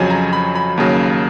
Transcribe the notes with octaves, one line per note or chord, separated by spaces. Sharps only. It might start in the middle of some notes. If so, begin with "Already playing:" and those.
Already playing: F2 C#3 F#3 G#5
A#5
B5
B5
D#2 C#3 F#3